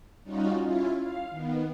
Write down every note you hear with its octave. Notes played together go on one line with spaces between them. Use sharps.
G3 C#4 D#4 F4 F#4
C#4 E4 F4
F5
D#3 B3